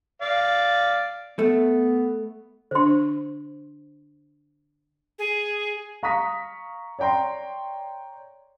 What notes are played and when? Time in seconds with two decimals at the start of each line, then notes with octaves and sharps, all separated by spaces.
0.22 D5 F5
1.39 A3 B3
2.71 D3 D4 C5 C6
5.19 G#4
6.03 F5 A#5 C#6 D#6 B6
6.99 C#5 D5 G5 A#5 C6